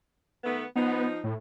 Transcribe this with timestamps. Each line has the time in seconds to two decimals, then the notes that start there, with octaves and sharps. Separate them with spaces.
0.44 D#3 A3 B3
0.76 F3 B3 D#4
1.24 A2